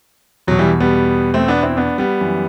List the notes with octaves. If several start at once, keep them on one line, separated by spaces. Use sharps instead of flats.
E2 B2 F#3
E3 G3
G3 B3
A3 C4
B3 D4
C4 E4
B3 D4
G3 B3
F#2 E3